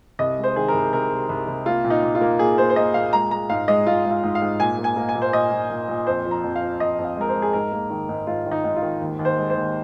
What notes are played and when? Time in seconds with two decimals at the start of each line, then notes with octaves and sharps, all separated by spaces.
0.19 C2 D#5
0.38 G#3
0.44 C5
0.56 D#3 G#4
0.68 A#4
0.74 C2
0.93 C3 A#4
1.11 C3
1.29 C2
1.48 C2
1.66 A#3 F4
1.84 A#2
1.90 D#4
2.03 A#2
2.15 F4
2.21 A#3
2.39 A#2 G#4
2.58 A#3 C5
2.70 C5
2.76 A#3 D#5
2.94 A#2 F5
3.13 G#3 A#5
3.31 G#3 A#5
3.49 G#2 F5
3.68 G#3 D#5
3.86 G#3 F4
4.05 G#3
4.11 F4
4.23 G#2
4.35 F5
4.41 G#2
4.60 A#2 G#5
4.78 A#3
4.84 G#5
4.96 A#3
5.09 G#5
5.15 A#2
5.22 C5
5.33 A#2 D#5
5.52 A#2
5.70 A#2
5.88 A#2
6.07 F2 C5
6.25 F3
6.31 A#5
6.44 F2
6.56 F5
6.62 F3
6.80 F2 D#5
6.99 F2
7.04 F5
7.17 G#3 A#4
7.29 C5
7.35 G#3
7.42 G#4
7.53 G#2 A#4
7.72 A#3
7.90 D#3
8.09 G#2
8.27 G#2 F4
8.46 D#3
8.51 D#4
8.64 G#2
8.76 F4
8.82 D#3
9.00 D#2
9.19 D#2
9.25 C5
9.37 G#3
9.50 C5
9.56 D#2